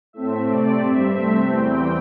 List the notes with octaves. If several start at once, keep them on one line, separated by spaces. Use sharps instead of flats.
A2 A3 C4 E5
C3 A3 C4 D5
G2 G3 C4 E5
C3 A3 C4
E2 E3 G3 C4 G5